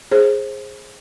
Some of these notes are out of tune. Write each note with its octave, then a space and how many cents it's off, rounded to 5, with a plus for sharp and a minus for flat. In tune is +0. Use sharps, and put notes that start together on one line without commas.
G#4 +0 C5 +25